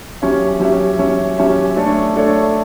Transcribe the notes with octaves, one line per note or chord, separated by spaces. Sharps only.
F#3 C#4 G4 C#5 E5
F#3 C#4 G4 C#5 E5
F#3 C#4 G4 C#5 E5
F#3 C#4 G4 C#5 E5
A3 D4 A4 C#5
A3 D4 A4 C#5